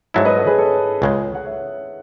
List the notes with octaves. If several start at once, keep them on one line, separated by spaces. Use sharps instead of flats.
G#2 F#3 A3 E4 C#5 E5
B4 D#5
A4 C#5
G#4 B4
A4 C#5
C#2 C#3 G#3
F#5
C#5 E5